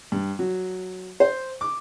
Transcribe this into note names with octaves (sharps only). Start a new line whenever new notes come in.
G2
F#3
C5
D6